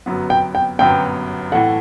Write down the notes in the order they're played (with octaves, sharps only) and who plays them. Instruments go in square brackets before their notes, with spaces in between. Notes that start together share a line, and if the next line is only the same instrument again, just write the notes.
[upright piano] G1 F#2 F#3 B3
[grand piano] G5
G5
[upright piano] G1 F#2 F#3 B3 [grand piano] G5
[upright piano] A2 E3 A3 [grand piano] F#5